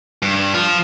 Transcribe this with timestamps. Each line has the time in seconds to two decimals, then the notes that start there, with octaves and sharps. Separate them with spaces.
0.22 G2
0.54 F3 F4